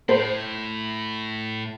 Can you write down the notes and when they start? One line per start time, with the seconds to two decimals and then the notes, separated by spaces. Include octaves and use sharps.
0.09 A2 C5